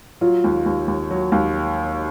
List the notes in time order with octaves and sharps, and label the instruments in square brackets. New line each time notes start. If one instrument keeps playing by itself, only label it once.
[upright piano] F#3 [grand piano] F4
[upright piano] D#2
D#2
D#2
F#3
D#2